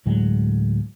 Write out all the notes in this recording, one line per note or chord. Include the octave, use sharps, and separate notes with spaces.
D2 A2 F#3 G#3